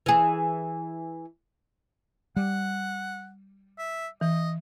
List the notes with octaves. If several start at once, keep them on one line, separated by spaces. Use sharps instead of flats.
E3 G#4
G3 F#5
E5
E3 D#5